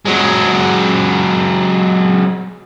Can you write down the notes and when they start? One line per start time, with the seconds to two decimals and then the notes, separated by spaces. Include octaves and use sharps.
0.05 F#3 G#3